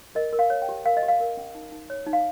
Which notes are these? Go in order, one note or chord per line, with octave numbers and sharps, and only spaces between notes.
A#4 D#5
A#4
F5
C#5
G5
G4
A#4 F5
D#5
G4
F5
A#4
C#4
D#4
D#4
C#5
D#4
F5